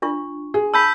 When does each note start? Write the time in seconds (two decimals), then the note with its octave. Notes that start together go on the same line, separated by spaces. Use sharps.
0.02 D4 F4 C#6
0.54 G#4
0.74 A5 B5 E6 G6 B6